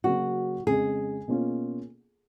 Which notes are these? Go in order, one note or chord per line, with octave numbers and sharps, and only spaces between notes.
C#3 F#3 A#3 C#4 F#4
F2 C#3 G#3 G#4
B2 A#3 C#4 F4